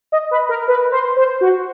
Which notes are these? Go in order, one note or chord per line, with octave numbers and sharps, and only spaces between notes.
D#5
B4
A#4
B4
C5
C5
F#4